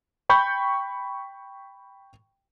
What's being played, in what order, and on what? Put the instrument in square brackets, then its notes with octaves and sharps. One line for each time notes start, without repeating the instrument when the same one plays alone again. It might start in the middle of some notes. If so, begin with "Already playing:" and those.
[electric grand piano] G5 B5 C#6 G6